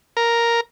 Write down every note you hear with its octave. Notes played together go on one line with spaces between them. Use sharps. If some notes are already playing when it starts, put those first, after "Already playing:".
A#4